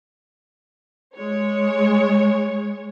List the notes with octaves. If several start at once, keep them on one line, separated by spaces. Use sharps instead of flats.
G#3 C#5